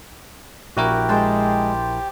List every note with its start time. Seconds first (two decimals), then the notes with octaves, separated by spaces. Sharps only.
0.77 A#1 E4 F#4 G4 A#4
1.09 G#3 C5 G5 A5